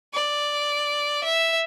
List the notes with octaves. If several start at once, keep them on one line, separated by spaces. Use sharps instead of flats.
D5
E5